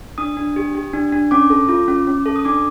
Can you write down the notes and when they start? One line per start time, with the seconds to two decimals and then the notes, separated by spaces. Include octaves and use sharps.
0.18 D4 D#6
0.37 D4
0.56 G4
0.75 G4
0.93 D4
1.12 D4
1.31 C#4 D6
1.50 A4
1.69 F4
1.88 C#4
2.07 C#4
2.26 A4
2.36 D#6
2.45 D4 D6